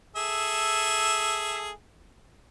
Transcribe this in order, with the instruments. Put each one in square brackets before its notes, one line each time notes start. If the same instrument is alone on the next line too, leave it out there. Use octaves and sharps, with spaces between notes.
[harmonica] G#4 A4 E5